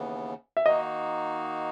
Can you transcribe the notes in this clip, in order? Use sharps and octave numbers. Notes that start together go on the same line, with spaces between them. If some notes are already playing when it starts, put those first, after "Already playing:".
Already playing: D#2 C#3 E3 B3
E5
D#3 A#3 D#4 F#4 D#5